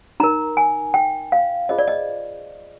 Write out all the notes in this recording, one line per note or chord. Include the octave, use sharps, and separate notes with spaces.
D#4 A#4 A#5
G#5
G5
F5
F4 G#4 C5 D#5
D5
D#5